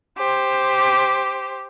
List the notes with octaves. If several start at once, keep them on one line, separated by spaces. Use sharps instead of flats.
G4 C5